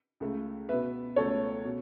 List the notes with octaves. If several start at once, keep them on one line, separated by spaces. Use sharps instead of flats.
C#2 C#3 A3
B2 B3 B4 E5
C#2 B2 A3 A4 C#5
B2